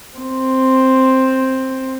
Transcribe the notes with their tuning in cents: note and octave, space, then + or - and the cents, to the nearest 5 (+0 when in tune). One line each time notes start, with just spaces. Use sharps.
C4 +5